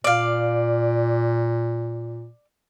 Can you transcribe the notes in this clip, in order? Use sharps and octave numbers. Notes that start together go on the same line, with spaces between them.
A#2 D5 F5